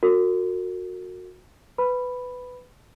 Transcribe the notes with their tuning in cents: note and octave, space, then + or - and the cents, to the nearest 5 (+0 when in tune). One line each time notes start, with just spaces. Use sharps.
F#4 -20 A#4 -40
B4 +15 B5 +0